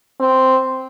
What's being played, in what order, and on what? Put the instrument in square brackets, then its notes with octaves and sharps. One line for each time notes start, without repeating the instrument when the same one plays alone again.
[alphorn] C4